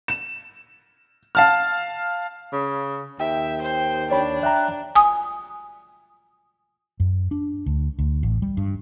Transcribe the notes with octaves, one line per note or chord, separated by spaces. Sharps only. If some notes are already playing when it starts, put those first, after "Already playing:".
E7
F5 A5 F6
C#3
D#2 E5 G5
C5
D4 C#5 B5
E5 G5 A#5 F#6
G#5 D#6
F#2
D4
D2
D2
A1
G3
G2